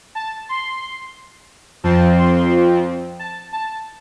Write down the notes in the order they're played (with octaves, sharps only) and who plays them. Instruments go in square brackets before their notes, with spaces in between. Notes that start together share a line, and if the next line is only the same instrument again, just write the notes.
[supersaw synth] A5
C6
F2 F3 C4 A5
C6
A5
A5